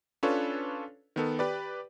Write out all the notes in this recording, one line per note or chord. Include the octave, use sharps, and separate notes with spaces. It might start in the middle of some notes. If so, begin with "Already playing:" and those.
C#4 D4 F4 A4 B4 C#5
D#3 B3 A4
G4 B4 D5